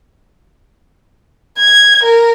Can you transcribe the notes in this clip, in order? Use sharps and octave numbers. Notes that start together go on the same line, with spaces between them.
G#6
A#4